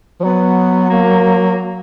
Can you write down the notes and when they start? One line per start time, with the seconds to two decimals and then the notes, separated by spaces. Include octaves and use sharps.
0.20 F3
0.24 F#3 B3
0.90 A#3